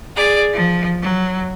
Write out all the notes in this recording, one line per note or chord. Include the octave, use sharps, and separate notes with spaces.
G#4 D5
F3
F#3